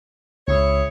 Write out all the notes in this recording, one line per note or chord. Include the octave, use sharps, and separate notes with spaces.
C#2 E4 G#4 C#5